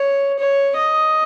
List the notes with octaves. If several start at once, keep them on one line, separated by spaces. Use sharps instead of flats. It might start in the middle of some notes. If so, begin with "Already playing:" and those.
Already playing: C#5
C#5
D#5